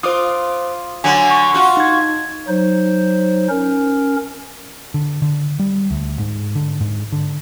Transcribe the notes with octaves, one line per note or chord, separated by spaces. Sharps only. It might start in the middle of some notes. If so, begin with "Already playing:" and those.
F4 C5 D6 D#6
D3 F#3 G#5
C#6
F4 F#4
D#4 G#6
F#3 D#4 C5
C#4 A#4
D3
D3
G3
D2
G#2
D3
G#2
D3